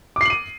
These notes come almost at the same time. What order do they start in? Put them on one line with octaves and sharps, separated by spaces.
D6 C7 F#7 D#7